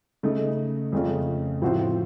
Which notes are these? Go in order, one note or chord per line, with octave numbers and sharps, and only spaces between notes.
C#3 A3 D#4
F2 C#3 A3 C#4 F4
A2 F3 C4 F#4 C5